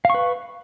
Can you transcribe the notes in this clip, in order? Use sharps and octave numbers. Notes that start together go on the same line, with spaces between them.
B4 F5 C#6